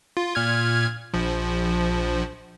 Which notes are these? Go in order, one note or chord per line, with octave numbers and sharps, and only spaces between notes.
F4
A#2 F6 G#6
A#1 F3